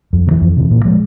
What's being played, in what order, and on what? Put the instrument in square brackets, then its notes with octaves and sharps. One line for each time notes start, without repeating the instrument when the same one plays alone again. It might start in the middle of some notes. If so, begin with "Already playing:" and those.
[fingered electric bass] F2
C3
E3
F2
C3 E3
A#2
F3 G#3